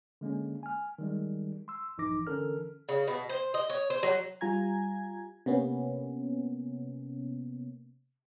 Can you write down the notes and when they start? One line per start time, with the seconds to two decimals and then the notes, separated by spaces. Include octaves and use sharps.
0.21 D3 G#3 A#3 C#4
0.63 G#5 F6
0.99 D#3 G3 G#3
1.68 C6 E6
1.98 A#1 G2 E3 D#4 D6 A#6
2.27 D3 E3 C#4 A4 A#4 F6
2.89 C#3
3.07 B2
3.29 C5
3.54 D#5
3.70 C#5
3.90 C5
4.03 F#3
4.41 G3 F4 G#5 A#5 G#6
5.46 C3 A#3 B3 C#4